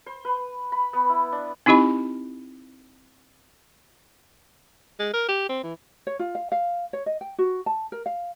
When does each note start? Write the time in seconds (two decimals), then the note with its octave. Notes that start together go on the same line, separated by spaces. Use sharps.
0.06 C5
0.25 B4
0.72 B5
0.93 B3
1.09 E4
1.32 D4
1.66 C4 D#4 E4 G4 D#5 B5
4.99 G#3
5.13 A#4
5.28 G4
5.49 C4
5.63 E3
6.07 C#5
6.19 F4
6.35 F5
6.52 F5
6.93 C#5
7.06 D#5
7.21 G5
7.38 F#4
7.66 A5
7.92 A#4
8.06 F5